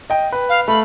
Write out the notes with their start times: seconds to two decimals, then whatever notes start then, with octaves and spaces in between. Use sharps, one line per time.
0.10 D#5 G5
0.32 B4
0.49 F5
0.68 A3 B5